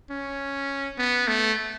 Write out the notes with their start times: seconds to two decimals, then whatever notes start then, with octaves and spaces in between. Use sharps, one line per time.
0.11 C#4
0.99 B3
1.28 A3